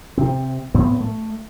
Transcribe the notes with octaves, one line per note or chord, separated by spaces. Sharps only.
C3 C4
A2 B3 C4
A3